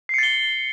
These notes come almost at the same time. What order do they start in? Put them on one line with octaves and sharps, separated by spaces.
C7 C#7 A6 G7